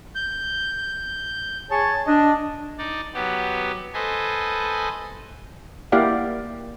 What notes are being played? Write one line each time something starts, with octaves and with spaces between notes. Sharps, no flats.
G6
G#4 C#5 A5
D4 D#5
D#4 D5
F#3 B3 G4
A4 B4 C5 D#5 G#5
A#3 E4 G4 D5 F5 F#5